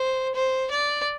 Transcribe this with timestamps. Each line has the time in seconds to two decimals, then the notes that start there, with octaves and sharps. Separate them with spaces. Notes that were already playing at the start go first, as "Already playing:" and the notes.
Already playing: C5
0.34 C5
0.70 D5